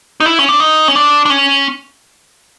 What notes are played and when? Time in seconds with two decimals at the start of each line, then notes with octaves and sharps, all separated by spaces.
0.20 D#4
0.26 E4
0.39 C#4
0.49 D4
0.60 D#4
0.88 C#4
0.95 D4
1.26 D4
1.30 C#4